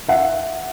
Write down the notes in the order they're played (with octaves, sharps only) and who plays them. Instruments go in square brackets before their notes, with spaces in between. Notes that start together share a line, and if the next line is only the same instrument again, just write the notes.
[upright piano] E5 F#5